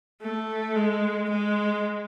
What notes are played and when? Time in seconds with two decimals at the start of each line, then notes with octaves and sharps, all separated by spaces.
0.22 A3
0.76 G#3
1.29 G#3